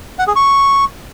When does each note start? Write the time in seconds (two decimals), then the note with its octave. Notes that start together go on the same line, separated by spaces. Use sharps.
0.19 F#5
0.27 G#4
0.36 C#6